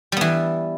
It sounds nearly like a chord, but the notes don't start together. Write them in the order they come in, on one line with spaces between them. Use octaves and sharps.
G3 B3 E3